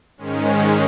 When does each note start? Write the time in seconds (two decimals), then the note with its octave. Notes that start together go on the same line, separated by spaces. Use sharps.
0.18 G#2 D#3 G#3 C#4